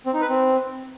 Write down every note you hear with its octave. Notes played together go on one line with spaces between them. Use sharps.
C4
D#4
B4
C4